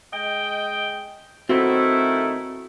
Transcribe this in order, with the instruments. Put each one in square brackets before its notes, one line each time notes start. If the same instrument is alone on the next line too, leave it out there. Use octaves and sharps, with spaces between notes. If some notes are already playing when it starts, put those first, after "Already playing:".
[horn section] G#3 D#5 G5
[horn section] D#3 A3 E4 [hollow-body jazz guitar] C4 [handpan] F#4